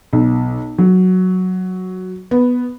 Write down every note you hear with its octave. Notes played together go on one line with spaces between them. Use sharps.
B1
F#3
B3